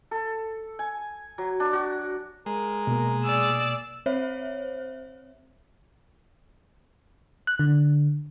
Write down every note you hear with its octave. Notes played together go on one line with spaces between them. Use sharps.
A4
G#5
F#3
D4
F#4
G#3 A#4
B2 A#3
G#4 D5 E6
C4 C5 C#5 E5
F#6
D3